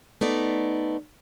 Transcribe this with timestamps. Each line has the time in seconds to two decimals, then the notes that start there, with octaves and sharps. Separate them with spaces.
0.21 A3 B3 D#4 D5